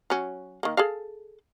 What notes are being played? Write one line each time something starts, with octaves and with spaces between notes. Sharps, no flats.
F#3 C#4
D#3 A#3
G#4 A4 F5